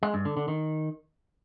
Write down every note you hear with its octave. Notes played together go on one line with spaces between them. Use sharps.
G#3
G2
D3
D3
D#3